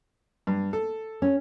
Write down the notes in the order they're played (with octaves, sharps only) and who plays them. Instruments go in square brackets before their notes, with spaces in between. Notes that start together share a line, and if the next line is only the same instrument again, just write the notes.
[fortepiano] G2
A4
[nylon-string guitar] C#4